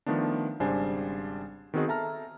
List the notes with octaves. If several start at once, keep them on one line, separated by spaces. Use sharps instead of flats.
D#3 F3 A3 B3 D4
G#1 C#3 G3 D4 C5 G#5
D#3 B3 C4 F#4 G#4 D#5
A4 E5 A5 A#5 F6